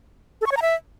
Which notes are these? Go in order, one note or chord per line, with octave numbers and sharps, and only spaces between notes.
A4
C#6
C#5
A#5
E5